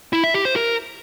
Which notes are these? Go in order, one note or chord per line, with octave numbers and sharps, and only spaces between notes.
E4
E5
G4
C5
A#4